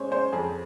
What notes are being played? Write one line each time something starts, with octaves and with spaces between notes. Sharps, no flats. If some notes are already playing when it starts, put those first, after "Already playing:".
Already playing: G#3 C#4 C5 C#5
C#4 C5
F2 G#4